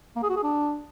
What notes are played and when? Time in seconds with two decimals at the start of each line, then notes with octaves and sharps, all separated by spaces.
0.16 A#3
0.23 G#4
0.30 F#4
0.36 G#4
0.43 D4